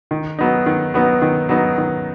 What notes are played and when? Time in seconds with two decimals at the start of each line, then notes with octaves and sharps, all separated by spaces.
0.11 D#3
0.39 F#3 B3 D#4
0.66 D#3
0.94 F#3 B3 D#4
1.22 D#3
1.49 F#3 B3 D#4
1.78 D#3